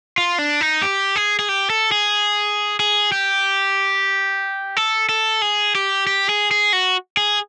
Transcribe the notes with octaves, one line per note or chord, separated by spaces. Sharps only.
F4
D4
D#4
G4
G#4
G#4
G4
A4
G#4
G#4
G4
A4
A4
G#4
G4
G4
G#4
G#4
F#4
G#4